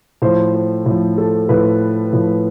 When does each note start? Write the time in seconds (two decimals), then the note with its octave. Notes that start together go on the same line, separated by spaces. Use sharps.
0.22 A2 F3 C5
0.54 C5
0.86 A2 F3
1.18 A4
1.49 A2 F3 B4
2.12 A2 F3